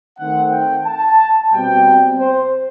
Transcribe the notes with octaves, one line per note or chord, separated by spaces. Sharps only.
D#3 A3 C4 F#5
G5
A5
B2 G3 C4 G5
C5